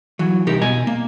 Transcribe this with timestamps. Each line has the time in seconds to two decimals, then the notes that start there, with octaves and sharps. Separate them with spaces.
0.19 E3 F#3
0.47 C2 D#4 G4 A#4
0.61 B2 D#5 G#5
0.87 A#3